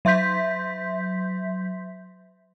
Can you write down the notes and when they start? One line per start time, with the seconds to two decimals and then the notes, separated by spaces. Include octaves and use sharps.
0.05 F#3 E5 C6 G6 B6